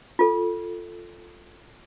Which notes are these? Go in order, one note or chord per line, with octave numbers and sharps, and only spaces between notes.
F4 A4